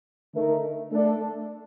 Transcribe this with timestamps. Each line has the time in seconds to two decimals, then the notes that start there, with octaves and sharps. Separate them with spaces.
0.35 D3 A3 D#4 A#4
0.91 A3 D4 A4